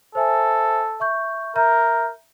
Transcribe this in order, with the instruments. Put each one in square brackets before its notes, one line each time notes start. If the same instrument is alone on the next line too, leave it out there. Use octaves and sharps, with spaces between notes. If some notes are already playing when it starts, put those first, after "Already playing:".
[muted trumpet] A4 [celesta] C5 E5 G#5
[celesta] E5 C#6 G6
[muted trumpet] A#4 [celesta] E5 A#5 G6